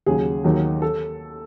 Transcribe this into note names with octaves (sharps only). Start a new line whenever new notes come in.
D#2 C#3 F#3 G#4
D#2 D#3 F#3
A4